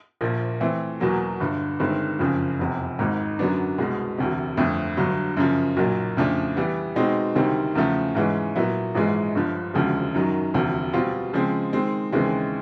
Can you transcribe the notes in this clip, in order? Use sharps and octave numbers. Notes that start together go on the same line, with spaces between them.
A#1 A#2 F3
E3 A3 C4
E2 B2 F#3 A#3
G1 G2 D3
G1 G2 D#3 G#3 C4
F#1 F2 C#3 F3
F1 E2 C3
G#1 G#2 D#3
F#2 D3 F#3 B3 D4
C2 B2 G#3
E1 D2 C3
G1 F2 D3 F3 A3
G1 G2 D3 F#3
F#2 C#3 F3
B1 A#2 F#3
F2 C#3 F3 A3 D4
E3 G3 B3
B2 G#3 C4 D#4
D2 C3 D#3 G3 C4
E2 C#3 F3 A3
G#2 E3 G#3 C#4
A#2 F#3 B3 E4
A#1 G#2 E3 G#3
G1 G2 D3 F3
E1 D2 C#3 F3 G#3
F#2 D#3 F#3
E1 D2 C3 F3
B2 G3 C4 F4
C#3 F3 G#3 C4
D#3 G#3 C4
D#2 C#3 E3 G#3 C4